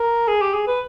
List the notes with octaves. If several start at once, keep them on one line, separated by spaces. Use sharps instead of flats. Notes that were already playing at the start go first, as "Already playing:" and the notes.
Already playing: A#4
G#4
G4
G#4
B4